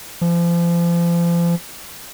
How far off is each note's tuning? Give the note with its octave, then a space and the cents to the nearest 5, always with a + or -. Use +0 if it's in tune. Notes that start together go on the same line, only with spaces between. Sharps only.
F3 -35